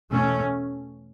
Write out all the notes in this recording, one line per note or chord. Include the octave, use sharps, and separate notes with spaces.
E2 B2 A3 C#4